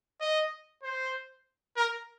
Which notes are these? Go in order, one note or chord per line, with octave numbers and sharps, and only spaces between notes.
D#5
C5
A#4